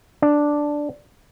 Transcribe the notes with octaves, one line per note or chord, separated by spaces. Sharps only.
D4